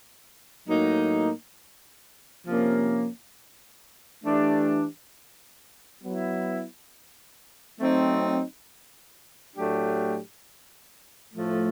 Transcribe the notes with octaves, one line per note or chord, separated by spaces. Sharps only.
A2 F#3 A#3 D#4
C3 F3 A#3 C#4
E3 A3 D4 G4
F#3 B3 E4
F#3 A3 C4 D#4
A2 F#3 A3 D4 G4
A2 F3 A3